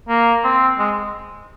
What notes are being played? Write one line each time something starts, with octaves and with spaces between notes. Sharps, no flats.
A#3
C4
G#3